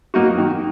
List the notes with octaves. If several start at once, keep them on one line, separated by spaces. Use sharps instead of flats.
F#3 A#3 D#4 F#4
D#3